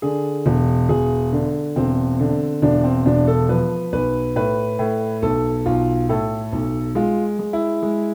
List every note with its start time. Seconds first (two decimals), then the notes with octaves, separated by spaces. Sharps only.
0.02 D3 G#4
0.46 E1
0.89 E1 G#4
1.32 D3
1.76 E1 C4
2.20 D3
2.62 E1 D4
2.84 C4
3.06 E1 D4
3.27 A4
3.49 F3 B4
3.93 B1 B4
4.36 A2 B4
4.79 A2
5.22 B1 A4
5.66 B1 F4
6.09 A2 A4
6.52 B1
6.95 G#3 F4
7.39 G#3
7.53 E4
7.83 G#3